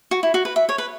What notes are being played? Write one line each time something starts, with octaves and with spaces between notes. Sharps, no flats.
F#4
E4
F#4
B4
E5
C#5
B4